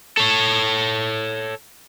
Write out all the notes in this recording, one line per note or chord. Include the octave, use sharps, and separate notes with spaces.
A4 C#5